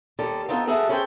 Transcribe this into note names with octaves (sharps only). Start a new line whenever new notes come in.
D#2 G3 A4
B3 C4 D#4 F4 A4
F#4 G#4 A4 B4 E5 F#5
C#4 E4 G#4 A4 C5 G5